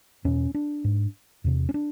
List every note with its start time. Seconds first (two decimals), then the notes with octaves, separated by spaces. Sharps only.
0.25 E2 B2 C#4
0.54 D4
0.84 G#2
1.44 E2 C3
1.69 C#4
1.74 D4